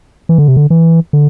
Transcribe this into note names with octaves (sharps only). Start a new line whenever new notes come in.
E3
D3
C3
D3
E3
D3